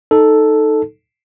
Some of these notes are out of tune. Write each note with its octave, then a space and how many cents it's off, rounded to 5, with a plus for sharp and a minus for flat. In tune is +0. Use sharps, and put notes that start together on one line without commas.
D#4 -5 A4 +0